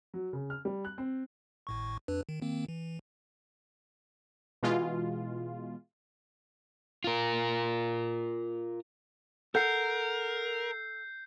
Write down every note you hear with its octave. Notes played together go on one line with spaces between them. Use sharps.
F#3
C#3
F6
G3
F#6
C4
G#1 A2 C#6
F2 D4 B4
D#3
D#3 A#3 C4
E3
B2 E3 G#3 F4
F4 A#4
A4 A#4 F#5 G6 C7